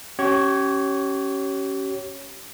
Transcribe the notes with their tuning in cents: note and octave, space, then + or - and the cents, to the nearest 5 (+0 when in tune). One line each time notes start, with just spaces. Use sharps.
C#4 +0 G4 -40 C#5 -5